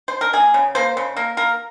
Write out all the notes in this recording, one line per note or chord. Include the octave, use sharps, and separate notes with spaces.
C5
A#4
A#3 G#4
C#3
A#3 C5
C#3
A#3 A#4
A#3 A#4